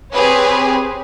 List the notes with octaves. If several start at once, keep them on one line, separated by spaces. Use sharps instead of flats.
C4 G4 G#4 B4 C#5